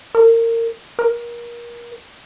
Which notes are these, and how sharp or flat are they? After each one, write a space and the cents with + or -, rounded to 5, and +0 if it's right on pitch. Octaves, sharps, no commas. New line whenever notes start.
A#4 -25
A#4 +30